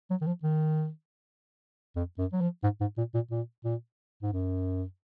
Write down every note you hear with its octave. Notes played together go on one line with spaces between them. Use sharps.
F#3
D#3
F3
D#3
F2
F#2
F#3
F3
G#2
G#2
A#2
A#2
A#2
A#2
G#2
F#2